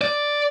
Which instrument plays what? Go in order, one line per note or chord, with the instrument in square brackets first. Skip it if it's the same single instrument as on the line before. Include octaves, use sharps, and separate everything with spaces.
[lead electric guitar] D5